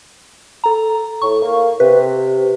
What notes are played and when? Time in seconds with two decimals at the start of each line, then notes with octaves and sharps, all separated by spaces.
0.64 A4 A#5
1.22 A2 C#6
1.42 A#3
1.80 C3 B4